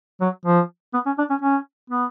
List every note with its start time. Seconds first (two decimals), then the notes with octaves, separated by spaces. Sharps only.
0.21 F#3
0.45 F3
0.94 B3
1.06 C#4
1.18 D4
1.30 C#4
1.42 C#4
1.90 B3